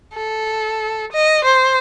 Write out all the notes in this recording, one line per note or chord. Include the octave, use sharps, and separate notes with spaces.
A4
D#5
C5